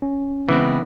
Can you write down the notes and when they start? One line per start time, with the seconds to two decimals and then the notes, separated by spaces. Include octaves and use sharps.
0.02 C#4
0.49 C#3 E3 G#3 B3 C4